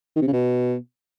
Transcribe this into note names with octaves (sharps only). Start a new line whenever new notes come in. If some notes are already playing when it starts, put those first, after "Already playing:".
D#3
C3
C#3
B2